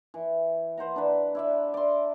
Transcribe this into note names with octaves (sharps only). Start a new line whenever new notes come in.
E3
B4 C5 F#5 A#5
D4 B4
E4 D5 E5
D5 C6